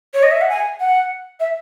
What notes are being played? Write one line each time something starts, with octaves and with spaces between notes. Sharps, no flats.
C#5
D#5
E5
F#5
G#5
F#5
E5